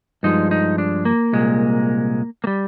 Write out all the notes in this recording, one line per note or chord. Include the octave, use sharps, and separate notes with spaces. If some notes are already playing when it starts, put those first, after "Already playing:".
G2 F3 G#3 D#4
D#4
D4
A#3
C2 A#2 G#3
A#3
G3